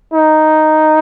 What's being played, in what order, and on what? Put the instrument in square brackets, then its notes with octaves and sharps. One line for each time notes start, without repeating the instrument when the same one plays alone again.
[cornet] D#4